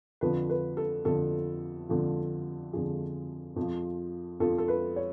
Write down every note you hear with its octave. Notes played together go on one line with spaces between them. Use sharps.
F2 D3 F3 B4
B4
A4
F2 D3 F3 A4
F2 D3 F3
F2 D3 F3 G#4
F2
F3
F2 F3 A4
A4
B4
C#5